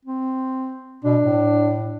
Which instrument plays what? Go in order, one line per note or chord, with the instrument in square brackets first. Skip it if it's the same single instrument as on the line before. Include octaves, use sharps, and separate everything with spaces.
[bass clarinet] C4
[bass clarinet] B2 [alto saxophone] D4
[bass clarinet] A2